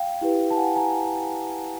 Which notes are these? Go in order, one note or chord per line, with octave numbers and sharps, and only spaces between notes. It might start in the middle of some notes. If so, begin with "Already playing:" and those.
Already playing: F5 G5
E4 G4 B4
A5
F#5 G#5
G#5 A#5